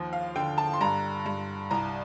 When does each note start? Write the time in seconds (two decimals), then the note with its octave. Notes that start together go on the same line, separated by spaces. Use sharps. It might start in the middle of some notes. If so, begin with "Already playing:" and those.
Already playing: D#2 D#3 F3
0.13 F5
0.36 D3 G5
0.58 A5
0.73 C6
0.81 G2 A#5
1.26 G2
1.70 C2 A#5